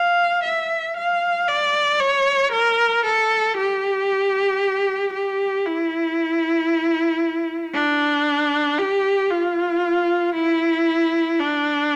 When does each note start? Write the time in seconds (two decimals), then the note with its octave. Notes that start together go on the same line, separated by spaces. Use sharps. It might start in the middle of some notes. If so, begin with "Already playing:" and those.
Already playing: F5
0.44 E5
0.97 F5
1.48 D5
2.00 C#5
2.52 A#4
3.05 A4
3.57 G4
5.13 G4
5.65 E4
7.73 D4
8.78 G4
9.31 F4
10.35 E4
11.39 D4